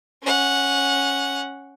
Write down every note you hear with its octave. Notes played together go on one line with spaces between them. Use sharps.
C#4 F#5